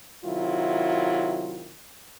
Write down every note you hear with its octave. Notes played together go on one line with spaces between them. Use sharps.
C3 D#3 F#3 E4 F4